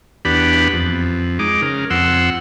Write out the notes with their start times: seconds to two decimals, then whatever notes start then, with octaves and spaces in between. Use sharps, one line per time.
0.25 E2 B3 D4 G4 B5
0.73 F2
1.39 G#3 D#4 D6
1.62 C#3 A#4
1.90 F2 F#5 C6 E6